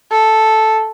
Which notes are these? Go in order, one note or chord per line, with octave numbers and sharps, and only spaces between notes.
A4